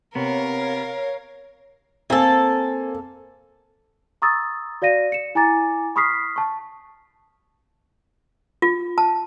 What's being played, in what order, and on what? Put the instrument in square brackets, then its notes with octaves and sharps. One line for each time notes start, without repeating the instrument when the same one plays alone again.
[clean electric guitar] C3 B3 [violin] A#4 F5 [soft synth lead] C#5
[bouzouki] A#3 A4 [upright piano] C4 G#5
[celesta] A#5 C#6 D#6 E6 A6
F#4 D5 F5 A#6 D#7
C#7 E7
E4 G#5 A#5 D6 A6
B5 C#6 D#6 F6 B6 C7
A5 C#6
[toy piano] F4
A5